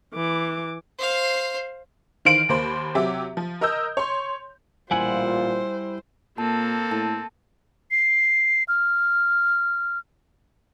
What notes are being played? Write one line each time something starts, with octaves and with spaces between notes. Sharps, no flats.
E3 D6
C5 F5
D#3 E3 C5 F5 D7 F#7
D#2 A#3 C5 B5
C3 F#3 G4 E5 D6
F3
A#4 D#5 D#6 E6 G6
C#5 C6
A1 A#2 G3 E4 F4 C5 F#5 G#5
A#2 A#3 C4 A4 A5
A2 A5
C7
F6